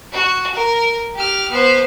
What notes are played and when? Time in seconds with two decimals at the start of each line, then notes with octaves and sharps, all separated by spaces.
0.13 F#4
0.54 A#4
1.15 G4 F6
1.50 B3 C5